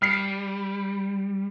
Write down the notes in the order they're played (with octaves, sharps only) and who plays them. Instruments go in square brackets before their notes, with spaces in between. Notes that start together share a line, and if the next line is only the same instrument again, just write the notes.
[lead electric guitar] G3 [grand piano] F6 C7 C#7